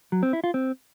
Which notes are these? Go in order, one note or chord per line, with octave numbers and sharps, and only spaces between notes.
F#3
C4
E4
F4
C4